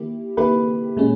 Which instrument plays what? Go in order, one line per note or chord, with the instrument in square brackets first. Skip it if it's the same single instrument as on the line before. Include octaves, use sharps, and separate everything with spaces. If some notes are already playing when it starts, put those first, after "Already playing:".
Already playing: [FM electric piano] D#3 A#3 E4 G4
[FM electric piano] D#3 A#3 E4 G4 [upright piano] B4
[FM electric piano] A#2 G#3 C#4